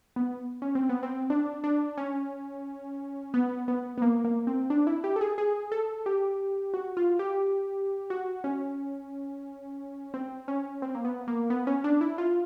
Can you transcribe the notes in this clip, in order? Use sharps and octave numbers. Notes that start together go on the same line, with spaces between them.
B3
C#4
C4
B3
C4
D4
D4
C#4
B3
B3
B3
A#3
A#3
C4
D4
E4
G4
A4
G#4
G#4
A4
G4
F#4
F4
G4
F#4
C#4
C4
C#4
C4
A#3
B3
A#3
B3
C#4
D4
E4
F4